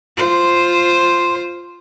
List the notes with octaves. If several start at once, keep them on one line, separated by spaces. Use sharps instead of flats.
F4 C5